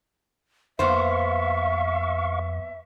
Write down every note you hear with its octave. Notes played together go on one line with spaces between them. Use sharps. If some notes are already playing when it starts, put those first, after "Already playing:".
F2 A#3 B3 C5 E5 F5 C#6